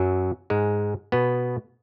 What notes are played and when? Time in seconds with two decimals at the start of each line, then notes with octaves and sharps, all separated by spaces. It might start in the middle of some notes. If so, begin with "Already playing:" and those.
Already playing: F#2 F#3
0.50 G#2 G#3
1.12 B2 B3